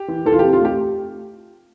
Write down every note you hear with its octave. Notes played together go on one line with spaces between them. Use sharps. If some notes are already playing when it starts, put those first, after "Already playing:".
Already playing: G4
E3
E3 A4
F4
C4 G4
F4
A3 G4